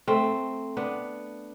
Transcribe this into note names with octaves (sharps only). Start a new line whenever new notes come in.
A3 C4
B3 D4